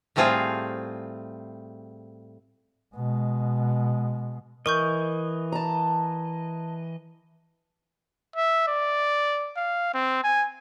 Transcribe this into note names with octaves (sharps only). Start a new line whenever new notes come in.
A2 G3 A3 C4 F4 G#4
B2 G#3
E3 A#4 D#5 C#6 G6
A5 A#5
E5
D5
F5
C4
G#5